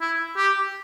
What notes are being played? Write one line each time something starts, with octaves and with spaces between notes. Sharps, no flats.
E4
G4